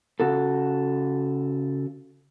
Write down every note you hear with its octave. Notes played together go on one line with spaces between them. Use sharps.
C#3 F#4 A4